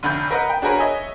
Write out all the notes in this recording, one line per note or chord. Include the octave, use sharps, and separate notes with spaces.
F1 D2 B5 G6
A#4 B4 D#5 F#5
G5
D4 F#4 G#4 A#4 B4 C#5
C#5 D#5 E5 G#5